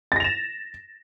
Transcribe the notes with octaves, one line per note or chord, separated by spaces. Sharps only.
A6 A#6 E7 F7